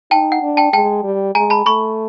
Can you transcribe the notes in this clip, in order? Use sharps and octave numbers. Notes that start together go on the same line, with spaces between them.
D#4 G5 A5
F#5
D4
G5 A5
G#3 G5 A5
G3
G#3 G#5 A#5
A5 B5
A3 B5 C#6